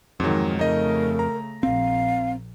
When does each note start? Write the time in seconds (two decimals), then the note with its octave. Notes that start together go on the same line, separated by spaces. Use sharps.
0.20 F2 G#2 D#3 F#3 G#3
0.59 C#3 A3 D#4 A#4 D#5
1.19 A#5
1.63 A#1 C4 F5